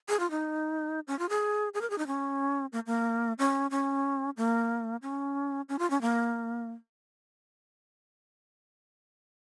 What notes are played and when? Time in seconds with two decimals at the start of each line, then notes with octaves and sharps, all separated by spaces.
0.09 G#4
0.20 F4
0.31 D#4
1.07 C#4
1.19 F4
1.29 G#4
1.74 G#4
1.81 A#4
1.90 G#4
1.98 D#4
2.07 C#4
2.73 A#3
2.87 A#3
3.39 C#4
3.71 C#4
4.37 A#3
5.02 C#4
5.69 C#4
5.79 F4
5.90 C#4
6.02 A#3